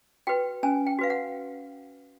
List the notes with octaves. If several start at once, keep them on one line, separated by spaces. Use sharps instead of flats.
F#4 B4 G5
C#4 G#5
G5
F#4 B4 F5
F#5